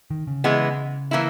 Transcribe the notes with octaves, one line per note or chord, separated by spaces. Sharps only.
D#3
C#3
E3 G#3 B3
E3 A#3 E4